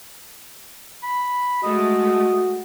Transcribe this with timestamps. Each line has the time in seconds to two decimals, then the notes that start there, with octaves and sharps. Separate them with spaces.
1.03 B5
1.63 G#3 A3 F#4 D#5